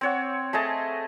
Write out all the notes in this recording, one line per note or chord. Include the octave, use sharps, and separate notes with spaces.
C4 C#5 F#5
A3 G#4 D#5 A5